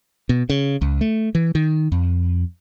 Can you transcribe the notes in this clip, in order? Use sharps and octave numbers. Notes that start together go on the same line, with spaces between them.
B2
C#3
C#2
A3
E3
D#3
F2